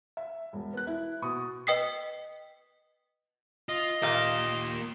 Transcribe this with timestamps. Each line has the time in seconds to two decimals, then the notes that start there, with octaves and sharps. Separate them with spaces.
0.17 E5
0.53 E1
0.74 B3 F#6
0.87 E4
1.22 B2 C#6 D#6
1.67 B4 D#5 G5 D#6 B6 C7
3.69 F4 D#5
4.02 A#2 A#3 G4 F5